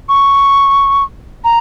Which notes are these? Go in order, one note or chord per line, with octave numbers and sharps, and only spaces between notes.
C#6
A#5